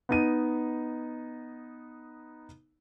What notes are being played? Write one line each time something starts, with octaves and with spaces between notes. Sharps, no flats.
B3 D#4 D#7